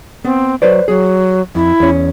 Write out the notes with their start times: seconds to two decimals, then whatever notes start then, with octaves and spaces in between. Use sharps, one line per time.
0.25 B3 C4
0.62 F#3 B4 C5 D5
0.88 F#3 G#4
1.55 F2 E4
1.80 E2 C#4